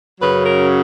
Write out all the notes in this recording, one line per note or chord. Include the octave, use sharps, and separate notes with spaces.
F#2 C#3 F#3 B4
A#4